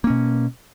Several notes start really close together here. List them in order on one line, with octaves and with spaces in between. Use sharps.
A#3 C#4 B2